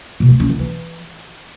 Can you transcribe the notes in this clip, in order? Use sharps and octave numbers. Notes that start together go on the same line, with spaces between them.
B2
A3
C#4
D3
E3